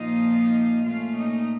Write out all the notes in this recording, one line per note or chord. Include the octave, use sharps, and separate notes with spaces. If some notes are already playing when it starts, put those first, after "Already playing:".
Already playing: A#2 F3 A#3 D#4 F4 D#5
D#4 D#5
A#2 A3 C#4 F4 F5
D#4 D#5